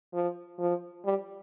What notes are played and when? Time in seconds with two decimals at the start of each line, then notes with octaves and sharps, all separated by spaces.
0.13 F3
0.59 F3
1.05 G3